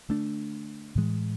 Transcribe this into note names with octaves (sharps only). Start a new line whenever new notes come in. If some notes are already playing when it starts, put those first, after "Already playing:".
D3 A3 D4
A2 E3 G#3